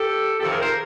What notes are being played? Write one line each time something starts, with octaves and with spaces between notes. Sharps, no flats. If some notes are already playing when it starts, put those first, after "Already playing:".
Already playing: G4 A4
F2 C3 D#3 G4 A4
G#4 A#4
A#4 C5